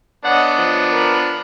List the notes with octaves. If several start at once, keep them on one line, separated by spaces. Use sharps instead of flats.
B3 D4 C#5 D#5 F#5
F3
A#4 B5